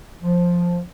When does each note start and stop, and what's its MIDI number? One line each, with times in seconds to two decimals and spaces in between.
0.22 0.81 53